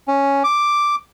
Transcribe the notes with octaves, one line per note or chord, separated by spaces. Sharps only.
C#4
D6